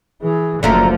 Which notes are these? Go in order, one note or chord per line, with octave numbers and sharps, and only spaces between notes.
E3 G#4
F#1 D3 F3 A3 A#5